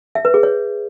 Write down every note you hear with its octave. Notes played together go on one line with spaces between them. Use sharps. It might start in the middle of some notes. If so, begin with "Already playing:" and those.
E5
B4
G#4
C#5